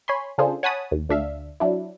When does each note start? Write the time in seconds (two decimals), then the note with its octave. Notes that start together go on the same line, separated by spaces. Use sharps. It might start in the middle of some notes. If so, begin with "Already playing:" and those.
0.08 C#5 G#5 B5 C6
0.38 C#3 D4 F4 G#4 A4 C5
0.63 C#5 F#5 G#5 A5 B5 D#6
0.91 D#2
1.09 D2 D4 E5 F5
1.60 F#3 D4 E4